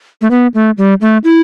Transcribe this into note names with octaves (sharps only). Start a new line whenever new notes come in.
A3
B3
A3
G3
A3
E4